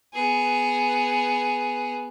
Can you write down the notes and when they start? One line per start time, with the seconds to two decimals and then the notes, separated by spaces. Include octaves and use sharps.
0.14 B3 G#4